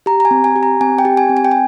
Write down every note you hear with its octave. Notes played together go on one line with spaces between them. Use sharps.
G4 A#5
A#5
G#5
C4
G#5
G4
A#5
C4 G#5
G5
G4
G#5
C4
G#5
G5
G#5